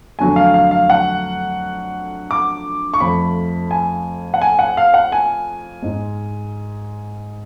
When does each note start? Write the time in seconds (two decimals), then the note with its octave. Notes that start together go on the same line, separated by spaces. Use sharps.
0.19 F2 D3 F#3 A3 G#5
0.36 F5
0.54 F5
0.71 F5
0.90 F#5
2.31 D6
2.94 C#6
3.00 F2 F3 A3 B5
3.71 G#5
4.34 F#5
4.42 G#5
4.59 F#5
4.77 F5
4.94 F#5
5.12 G#5
5.82 G#2 G#3